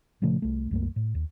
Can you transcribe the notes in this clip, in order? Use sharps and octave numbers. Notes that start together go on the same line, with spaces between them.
A#2 C#3 F3 A3
C2 A3
C2 F#2 A3 A#3
A2
D#2